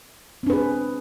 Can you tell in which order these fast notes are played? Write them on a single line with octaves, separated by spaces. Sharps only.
C4 D4 B4 G#4